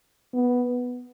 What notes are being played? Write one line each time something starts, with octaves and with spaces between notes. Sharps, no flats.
B3